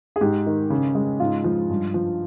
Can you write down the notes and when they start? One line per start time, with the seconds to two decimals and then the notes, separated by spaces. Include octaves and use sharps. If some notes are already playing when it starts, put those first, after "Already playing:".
0.16 G#4
0.21 G#2 G4
0.46 D#3
0.70 C#3
0.95 G#3
1.20 G#2 F4
1.44 F3
1.69 G2
1.94 F3